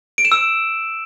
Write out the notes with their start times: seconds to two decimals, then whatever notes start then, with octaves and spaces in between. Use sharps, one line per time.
0.18 D7
0.25 E7
0.32 E6